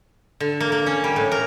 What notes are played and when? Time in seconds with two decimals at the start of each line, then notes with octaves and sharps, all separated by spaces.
0.40 D3
0.60 A#3
0.72 A#3
0.87 C#4
1.04 G3
1.16 A2
1.32 A#4